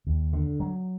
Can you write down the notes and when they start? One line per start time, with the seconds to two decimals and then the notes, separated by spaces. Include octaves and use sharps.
0.07 D#2
0.33 D3
0.60 F#3